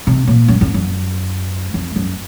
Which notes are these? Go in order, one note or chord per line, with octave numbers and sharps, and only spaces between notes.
C3
A#2
F#2
F2
F#2
F2
F#2